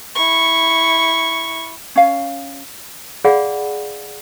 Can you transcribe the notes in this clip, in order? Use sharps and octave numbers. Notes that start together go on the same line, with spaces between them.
E4 C#6
C#4 F5
G#4 D5 F5 F#5 B5